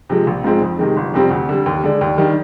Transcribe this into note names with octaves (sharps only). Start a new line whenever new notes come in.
C3 F3 G#3
A#1
G#2 F3 G#3 C4
F2
C3 D#3 G#3
G1
F2 C3 G3 C4
D2
D3 G3
D#2
D3 G#3 D4
D#2
D#3 G3 D4